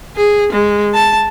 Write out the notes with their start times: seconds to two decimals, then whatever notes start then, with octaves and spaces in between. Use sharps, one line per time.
0.17 G#4
0.52 G#3
0.94 A5